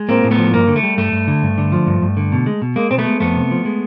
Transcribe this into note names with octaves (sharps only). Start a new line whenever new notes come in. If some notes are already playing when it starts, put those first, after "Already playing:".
Already playing: G#3
A2 A#3 C4
A2
A3 B3
F3
G2 A#3
D3
A3
G3
G2 A3
G2
D3
G2
D3
F3
G2
G2
D3
B2
G#3
B2
G#3 A#3
B2 C4
A3 B3
G#3
F2 A3 B3
C3
F3
G#3